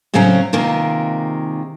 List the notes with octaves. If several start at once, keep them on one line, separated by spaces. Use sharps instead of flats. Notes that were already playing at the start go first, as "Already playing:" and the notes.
A2 C#3 F#3 C4 C#4 F#4
C3 D#3 G#3 A#3 F4